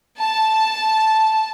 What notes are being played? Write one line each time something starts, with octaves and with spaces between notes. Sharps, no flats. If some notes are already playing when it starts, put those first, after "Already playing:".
A5